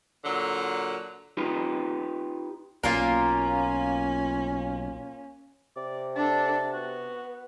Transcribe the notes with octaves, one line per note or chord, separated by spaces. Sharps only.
A#2 D3 F#3
D#4 F4 G4 B4
B1 A#3 C#4 F4 A#4
C3 D5
D4 A4 A5
B3 F#4